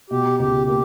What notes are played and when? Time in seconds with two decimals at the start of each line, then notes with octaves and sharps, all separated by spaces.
0.10 B2 G4
0.39 C#2 G4
0.67 A#3 G4